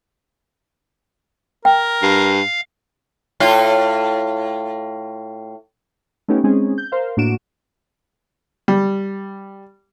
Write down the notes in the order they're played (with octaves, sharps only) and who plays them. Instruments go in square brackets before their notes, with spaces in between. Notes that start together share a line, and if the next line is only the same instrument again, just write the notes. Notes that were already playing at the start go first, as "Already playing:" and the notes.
[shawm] A#4 [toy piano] G5
[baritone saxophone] G2 [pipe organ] F5
[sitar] A2 F4
[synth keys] A3 B3 C#4 D#4 G4
G#3 C4 C#4 D#4 G#4
G6
A#4 C5 F5
A2 A#3 D4 F#4 D7 E7
[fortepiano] G3